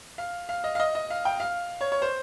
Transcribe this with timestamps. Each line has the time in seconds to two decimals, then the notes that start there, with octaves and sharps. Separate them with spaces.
0.18 F5
0.49 F5
0.64 D#5
0.75 F5
0.80 D#5
0.95 D#5
1.10 F5
1.25 G5
1.40 F5
1.81 C#5
1.92 C#5
2.02 C5